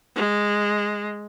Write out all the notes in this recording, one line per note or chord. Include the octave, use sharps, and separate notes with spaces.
G#3